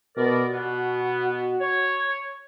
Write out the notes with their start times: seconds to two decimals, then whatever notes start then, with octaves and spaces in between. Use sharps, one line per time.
0.17 B2 A#4 D5
0.52 B2 B3 F#4
1.60 C#5